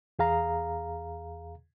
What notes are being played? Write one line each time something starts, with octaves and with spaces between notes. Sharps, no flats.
E2 G#4 F5 A#5